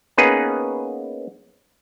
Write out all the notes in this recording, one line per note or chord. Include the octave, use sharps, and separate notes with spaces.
A#3 B3 C#4 D#4 G#4 B4